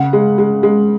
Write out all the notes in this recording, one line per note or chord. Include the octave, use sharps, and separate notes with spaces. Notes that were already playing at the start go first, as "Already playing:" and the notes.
Already playing: C#3 F#5
G#3
G#3
G#3